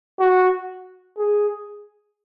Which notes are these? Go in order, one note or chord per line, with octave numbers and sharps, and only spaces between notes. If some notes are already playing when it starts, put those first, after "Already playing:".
F#4
G#4